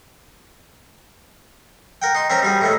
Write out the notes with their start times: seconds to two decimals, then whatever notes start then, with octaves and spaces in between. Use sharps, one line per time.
2.02 A#4 F#5 G5
2.15 D#4 C6
2.30 C4 C#4 A#4 A#5
2.42 G3 F#4 G#4
2.61 A2 D#3 A3